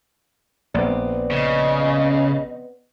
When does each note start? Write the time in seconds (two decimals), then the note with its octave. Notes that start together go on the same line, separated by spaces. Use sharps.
0.74 A#1 B3 C4 D5
1.31 C#3 D#5